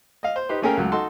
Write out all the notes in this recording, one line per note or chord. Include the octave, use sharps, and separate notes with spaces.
D#5 F5
C5
D#4 G4 B4 C5
A3 A#3 C#4 G#4 A#4 G5
C#2 F#3 A3
D#4 F#4 A4 C6